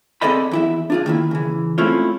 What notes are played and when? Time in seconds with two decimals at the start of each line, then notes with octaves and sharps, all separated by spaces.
0.21 C4 G#4 A4 D5 D#5 B5
0.51 E2 E4 E5
0.90 D4 F4 G#4
1.06 D#3 A#3 E4
1.31 C#3 E3
1.78 G#3 A3 C4 C#4 E4 F4